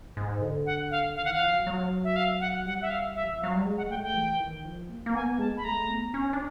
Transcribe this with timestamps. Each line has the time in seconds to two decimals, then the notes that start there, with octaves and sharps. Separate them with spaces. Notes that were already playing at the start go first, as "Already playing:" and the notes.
0.17 G#2
0.41 D3
0.66 F#5
0.91 F5
1.16 D#3 F5
1.25 F#5
1.29 E3
1.34 F5
1.42 F3
1.53 F#3
1.67 F#3
2.04 E5
2.16 F5
2.40 F#5
2.65 G3 F#5
2.82 E5
2.90 F5
3.16 E5
3.23 E3
3.34 F3
3.40 F5
3.44 F#3
3.54 G3
3.65 G#3
3.77 F#5
3.90 A3 G5
4.03 G5
4.14 E3
4.40 D#3
4.64 F3
4.89 A#3
5.06 A#3
5.14 B3 G#5
5.39 G#3 A5
5.57 B5
5.64 A3 A#5
5.89 B3
6.14 C#4
6.33 D4